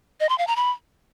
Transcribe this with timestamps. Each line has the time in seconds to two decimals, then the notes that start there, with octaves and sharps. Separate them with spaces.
0.20 D#5
0.29 C6
0.38 F5
0.47 A#5
0.56 B5